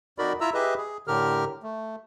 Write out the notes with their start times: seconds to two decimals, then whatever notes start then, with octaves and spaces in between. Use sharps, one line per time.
0.18 F2 D#4 F#4 A#4 D5 B5
0.41 E4 F4 E5 A#5 E6
0.54 G4 G#4 B4 D#5 E5
0.78 G#4
1.07 A2 D3 G4 A#4 F6
1.63 A3